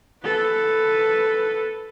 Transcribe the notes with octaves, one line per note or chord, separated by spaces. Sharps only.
A4 B4